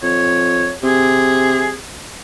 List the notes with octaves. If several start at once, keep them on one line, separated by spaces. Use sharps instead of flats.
F2 C#5
C3 G#4